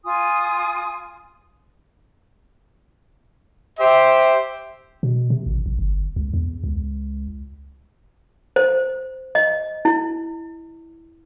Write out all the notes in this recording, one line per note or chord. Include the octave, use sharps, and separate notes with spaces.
F4 G#5 D#6
G4 C5 E5
B2
C3
A1
A#1
G1
C#2
E2
C#2
C5
D#5
E4